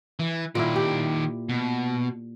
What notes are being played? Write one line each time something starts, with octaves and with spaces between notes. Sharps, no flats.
E3
A#2 D#3 E4 D5
G4
B2